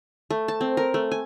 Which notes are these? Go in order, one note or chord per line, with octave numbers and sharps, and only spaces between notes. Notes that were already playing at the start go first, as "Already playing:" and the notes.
A3
A5
C4
A#4
A3
G#5